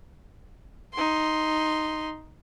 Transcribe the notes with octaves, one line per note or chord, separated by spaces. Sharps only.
D#4 C6